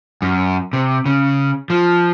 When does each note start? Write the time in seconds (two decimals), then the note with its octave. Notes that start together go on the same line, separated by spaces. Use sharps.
0.22 F#2
0.73 C3
1.06 C#3
1.70 F3